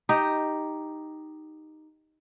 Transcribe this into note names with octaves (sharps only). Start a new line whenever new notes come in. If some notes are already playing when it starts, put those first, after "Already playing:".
D#4 G4 D#5